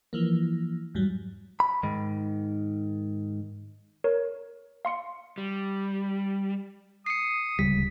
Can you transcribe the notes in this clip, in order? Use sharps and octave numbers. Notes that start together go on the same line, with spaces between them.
E3 F3 A#3
E2 G#2 F#3 G3
B5
G#2 D#3
A#4 C#5
F5 C6 C#7
G3
D#6 C7 C#7
D1 C#2 G3 B6